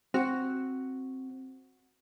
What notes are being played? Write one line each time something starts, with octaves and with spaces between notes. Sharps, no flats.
C4 F#4